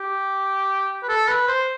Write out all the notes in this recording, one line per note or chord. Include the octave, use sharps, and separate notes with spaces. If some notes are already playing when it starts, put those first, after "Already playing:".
Already playing: G4
B4
A4
B4
C5